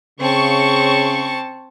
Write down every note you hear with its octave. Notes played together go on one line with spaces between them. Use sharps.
C#3 C4 A5 C#6